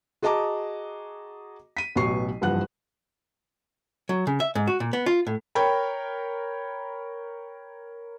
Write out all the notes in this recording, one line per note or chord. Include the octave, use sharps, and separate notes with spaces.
F#4 G#4 D#5 A5 A#5 D6
B6 D#7
A1 B2 F#3 C#6 C7
F#1 G2 E3 F3 F#5 F#6
F#3
C#3
E5
G#2
F#4
A#2
B3
F4
A2
A#4 C#5 G5 B5